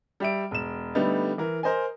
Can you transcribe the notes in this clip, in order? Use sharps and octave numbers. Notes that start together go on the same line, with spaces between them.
G3 E5 D7
E1 E7
D3 G3 A3 B3 D#4
E3 A#4
A#4 C5 D#5 G#5